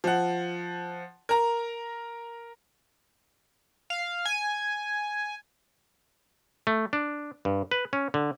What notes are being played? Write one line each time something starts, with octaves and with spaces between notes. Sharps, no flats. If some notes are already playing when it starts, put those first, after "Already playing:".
F3 F#5
A#4 A#5
F5
G#5
A3
D4
G2
B4
C#4
D3